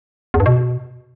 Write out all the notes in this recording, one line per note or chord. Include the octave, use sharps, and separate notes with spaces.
E2
G2
B2